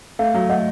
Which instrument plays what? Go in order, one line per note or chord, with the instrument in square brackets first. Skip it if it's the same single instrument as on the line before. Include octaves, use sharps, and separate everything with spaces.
[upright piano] A3 [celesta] F5
[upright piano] F#3
[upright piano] A3 [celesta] D#5 F#5